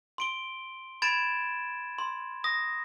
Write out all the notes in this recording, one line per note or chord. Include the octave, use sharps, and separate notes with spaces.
C6 D7 G7
B5 G#6 A6 D7 E7
C6
D#6 A#6